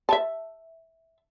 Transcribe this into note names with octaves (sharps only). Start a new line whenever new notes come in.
E5 A5